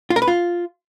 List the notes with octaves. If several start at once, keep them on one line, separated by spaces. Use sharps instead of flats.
F4
A#4
B4
F4